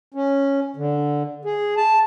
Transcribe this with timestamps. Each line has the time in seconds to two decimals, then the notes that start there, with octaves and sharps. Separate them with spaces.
0.14 C#4
0.76 D3
1.45 G#4
1.77 A5